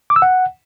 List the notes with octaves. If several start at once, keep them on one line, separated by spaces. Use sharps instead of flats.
D6
E6
F#5